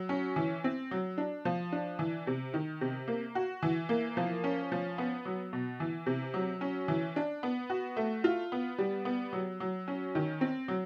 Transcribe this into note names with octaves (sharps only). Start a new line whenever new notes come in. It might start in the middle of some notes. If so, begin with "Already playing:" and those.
Already playing: F#3
C#4
E3
C4
F#3
D4
F3
D4
E3
C3
D#3
C3
A#3
F#4
E3
A#3
F3
C#4
F3
B3
F#3
B2
E3
C3
F#3
C#4
E3
D4
B3
F#4
A3
F4
B3
G3
B3
F#3
F#3
C#4
D#3
C4
F#3